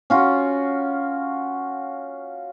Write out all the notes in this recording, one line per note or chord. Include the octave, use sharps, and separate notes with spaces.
C#4 F4 F#4